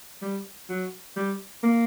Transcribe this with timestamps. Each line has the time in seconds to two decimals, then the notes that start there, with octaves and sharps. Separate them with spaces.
0.22 G3
0.69 F#3
1.16 G3
1.63 A#3